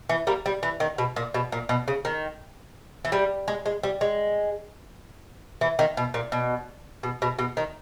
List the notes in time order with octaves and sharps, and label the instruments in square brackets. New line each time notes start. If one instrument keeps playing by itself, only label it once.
[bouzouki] E3
G3 A#3
G3
E3
D#3
B2
A#2
B2
A#2
B2
C#3
D#3
E3
G3
G#3
G#3
G3
G#3
E3
D#3
B2
A#2
B2
B2
B2
B2
D#3